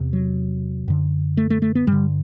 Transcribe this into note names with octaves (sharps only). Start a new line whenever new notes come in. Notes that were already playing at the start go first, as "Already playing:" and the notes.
Already playing: E2 C3
F#3
F#2 D3
A3
A3
A3
B3
G2 D3 G3